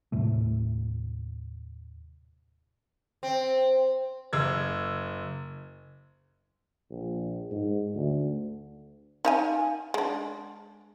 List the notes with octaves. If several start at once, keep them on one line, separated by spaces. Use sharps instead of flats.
D#2 A2 C3 A3
C4
F#1 E6 G#6
A#1
G#2
D2
D#4 F5 G#5
G#3 D4